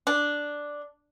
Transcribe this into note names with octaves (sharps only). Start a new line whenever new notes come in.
D4